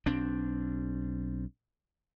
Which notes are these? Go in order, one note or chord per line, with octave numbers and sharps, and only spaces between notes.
B1 C4 D4